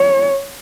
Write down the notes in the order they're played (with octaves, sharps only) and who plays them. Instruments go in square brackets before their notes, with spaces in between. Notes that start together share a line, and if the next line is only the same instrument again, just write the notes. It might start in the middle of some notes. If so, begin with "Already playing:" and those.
Already playing: [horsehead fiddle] C#5